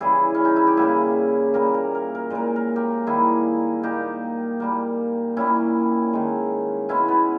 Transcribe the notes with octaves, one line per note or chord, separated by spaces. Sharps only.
C#3 E3 G3 E4 G#4
C#4
D#4
E4
G4
C#3 G3 A#3 E4 G#4
A#2 G3 A#3 A#4
A#4
A#4
A#4
A#2 G#3 A#4
A#4
G4 A#4
D#3 G3 A#3 E4 G#4
A#2 A#3 D#4 G4
A#2 G3 A#3
A#2 G3 A#3 C#4 E4
D#3 G#3
B2 G#3 C#4 E4
B3